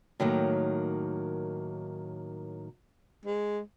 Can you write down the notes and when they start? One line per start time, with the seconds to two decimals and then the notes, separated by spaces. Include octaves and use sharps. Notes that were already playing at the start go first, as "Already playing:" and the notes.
0.20 A2 D#3 F#3 A#3
3.26 G#3